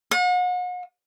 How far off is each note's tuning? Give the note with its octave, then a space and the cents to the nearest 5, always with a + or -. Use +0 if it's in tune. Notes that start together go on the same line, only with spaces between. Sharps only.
F#5 -40